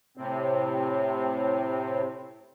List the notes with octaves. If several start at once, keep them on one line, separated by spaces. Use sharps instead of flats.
A2 C3 C4